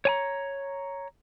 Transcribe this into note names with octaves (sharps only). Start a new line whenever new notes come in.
C#5 G#5 A#5